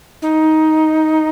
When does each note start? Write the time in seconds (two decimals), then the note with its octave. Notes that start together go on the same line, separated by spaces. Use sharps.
0.22 D#4